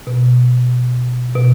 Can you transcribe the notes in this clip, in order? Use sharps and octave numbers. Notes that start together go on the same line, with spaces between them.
B2
B2